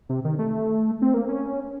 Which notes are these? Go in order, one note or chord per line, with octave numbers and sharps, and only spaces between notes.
C3
D#3
A3
C4
A#3
C#4